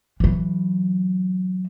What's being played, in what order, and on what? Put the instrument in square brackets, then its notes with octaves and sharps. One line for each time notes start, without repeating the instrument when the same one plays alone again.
[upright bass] E3 F#3